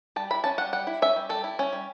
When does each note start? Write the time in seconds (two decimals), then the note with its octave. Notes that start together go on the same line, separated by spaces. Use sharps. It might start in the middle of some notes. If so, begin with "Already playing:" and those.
0.16 G3 A5
0.31 E4 B5
0.44 C#4 A5
0.58 G3 F#5
0.73 G3 F#5
0.87 E4
1.02 C#4 E5
1.16 G3
1.29 G3 A4
1.44 E4
1.59 C#4
1.73 G3